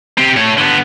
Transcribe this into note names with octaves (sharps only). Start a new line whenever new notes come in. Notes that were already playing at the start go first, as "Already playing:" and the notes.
C4 G4
A3 C#5
D3 B3